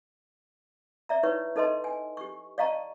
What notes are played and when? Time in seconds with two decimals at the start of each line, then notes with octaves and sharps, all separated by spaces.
1.09 D5 E5 A#5
1.23 D#4 E4 B4 C#5 C#6
1.56 D#4 A4 B4 D#5 A5 C6
1.84 G#5
2.17 G4 C#6
2.58 D5 D#5 F5 A5 A#5 C#6